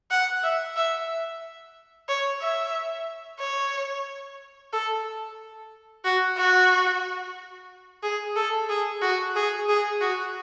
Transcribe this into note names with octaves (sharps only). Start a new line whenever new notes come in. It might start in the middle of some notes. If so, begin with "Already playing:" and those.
F#5
E5
E5
C#5
E5
C#5
A4
F#4
F#4
G#4
A4
G#4
F#4
G#4
G#4
F#4